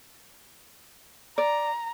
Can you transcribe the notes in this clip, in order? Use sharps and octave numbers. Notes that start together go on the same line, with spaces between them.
D5 A#5